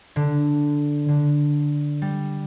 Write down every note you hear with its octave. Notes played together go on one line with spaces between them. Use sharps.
D3
D3
G3